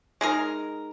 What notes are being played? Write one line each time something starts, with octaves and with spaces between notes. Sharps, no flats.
G#3 D#4 A#4